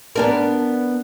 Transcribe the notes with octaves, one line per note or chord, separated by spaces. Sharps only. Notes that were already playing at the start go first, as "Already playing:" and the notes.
B3 D4 A#4